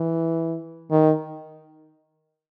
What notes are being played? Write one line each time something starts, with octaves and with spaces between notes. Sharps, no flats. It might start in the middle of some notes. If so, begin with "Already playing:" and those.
Already playing: E3
D#3